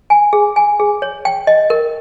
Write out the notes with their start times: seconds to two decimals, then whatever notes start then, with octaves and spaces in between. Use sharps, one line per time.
0.10 G#5
0.33 G#4
0.56 G#5
0.80 G#4
1.02 C#5
1.25 G5
1.47 D#5
1.70 A#4